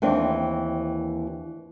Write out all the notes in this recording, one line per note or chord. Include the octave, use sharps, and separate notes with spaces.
D#2 E3 C4 D4